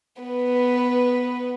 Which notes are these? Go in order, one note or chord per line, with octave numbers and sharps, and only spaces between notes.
B3 B4